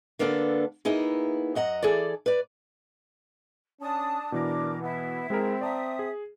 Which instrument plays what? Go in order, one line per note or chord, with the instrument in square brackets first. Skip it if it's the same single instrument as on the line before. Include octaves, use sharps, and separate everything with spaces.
[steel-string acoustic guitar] D3 A#3 B3 D4 G#4 A4
A#3 B3 D#4 E4 G#4
F#2 D#5 F#5 A#5
E3 G#4 A4 D5
B4 D5
[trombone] C#4 [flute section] D4 A5 D#6
[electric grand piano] B2 E3 [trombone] D4 [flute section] A#4 D6
[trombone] B3 [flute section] E4
[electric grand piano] G#3 G#4 A#4 [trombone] C4
[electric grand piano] D5 A5 A#5 [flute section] E5 D#6
[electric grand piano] G#4